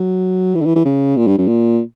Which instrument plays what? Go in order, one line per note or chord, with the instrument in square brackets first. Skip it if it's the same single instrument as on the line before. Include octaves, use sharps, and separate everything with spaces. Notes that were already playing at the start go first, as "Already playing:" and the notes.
Already playing: [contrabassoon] F#3
E3
D3
E3
E3
C#3
A#2
G2
F#2
A#2